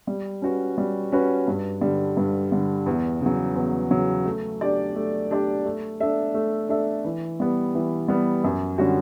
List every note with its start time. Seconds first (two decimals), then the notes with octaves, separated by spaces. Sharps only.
0.07 G3
0.42 C#4 F#4 B4
0.78 G3
1.12 C#4 F#4 B4
1.48 G2
1.81 D3 G3
2.17 G2
2.52 D3 G3
2.86 E2
3.21 C#3
3.26 F#3
3.55 E2
3.91 C#3 F#3
4.25 A3
4.61 D4 G4 D5
4.95 A3
5.31 D4 G4 D5
5.65 A3
6.00 D4 A4 E5
6.34 A3
6.69 D4 A4 E5
7.05 E3
7.40 G3 B3
7.75 E3
8.08 G3 B3
8.44 F#2
8.78 D3 G3 C#4 F#4